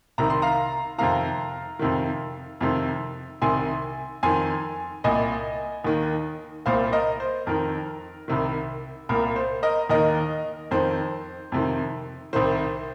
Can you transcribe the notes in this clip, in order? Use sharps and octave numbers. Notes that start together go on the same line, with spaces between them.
C2 C3 D#3 A#5
C6
F5 A#5
F2 C3 D#3 F5 A#5
F2 C3 D#3
F2 C3 D#3
C2 C3 D#3 G#5 C6
F2 D#3 G#5 C6
C2 A#2 D#5 G#5
D#2 D#3
C2 A#2 C5 F5
A#4 D#5
C5
F2 D#3 A#4
C2 C3 D#3
C2 A#2 A#4
C5
A#4 D#5
D#2 D#3 A#4 D#5
F2 D#3 C5
F2 C3 D#3
C2 C3 D#3 C5